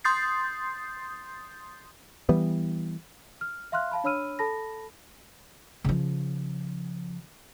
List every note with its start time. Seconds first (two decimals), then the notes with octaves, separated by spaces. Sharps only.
0.04 C6 D#6 G6 A6 C7
2.29 E3 G3 B3
3.41 F6
3.72 E5 F5 C6 F6 F#6
3.91 F5 A5 B5
4.04 D4 C#5 B5 E6 F6 D#7
4.39 A4 A5 B5 A#6
5.84 C#3 F3